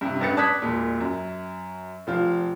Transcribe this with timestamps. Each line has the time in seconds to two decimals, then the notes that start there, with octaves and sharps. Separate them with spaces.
0.01 G2 C3
0.20 A1 G2 B3 A6 C#7
0.37 D5 A5 D#6 F#6 G#6 B6
0.62 E1 A#2
1.00 F#2
2.07 F1 F3 F4